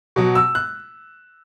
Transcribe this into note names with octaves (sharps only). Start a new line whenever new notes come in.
B2 F#3
E6
F#6